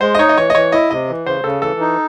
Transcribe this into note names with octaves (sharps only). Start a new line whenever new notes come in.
G#3 C5
D#5
D#4 C#5
D#5
E3 C#5
D#5
E3 C#5
E4 D#5
C3 D#5
E3
C#3 C5
C#3 A4
E3 A4
D#4